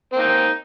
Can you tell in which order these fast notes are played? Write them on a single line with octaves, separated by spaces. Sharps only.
C4 A#3 D#4